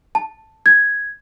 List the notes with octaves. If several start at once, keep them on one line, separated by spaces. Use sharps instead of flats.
A5
G#6